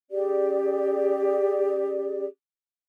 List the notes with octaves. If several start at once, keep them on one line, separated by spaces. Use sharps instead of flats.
C#4 G4 G#4 D5